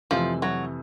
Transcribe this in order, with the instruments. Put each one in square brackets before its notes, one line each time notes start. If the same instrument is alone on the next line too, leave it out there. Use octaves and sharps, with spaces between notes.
[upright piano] F2 C3 E3 A3 [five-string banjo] F3
[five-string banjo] F#3